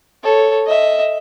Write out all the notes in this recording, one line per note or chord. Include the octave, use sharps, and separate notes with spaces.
A4 C#5
D#5 E5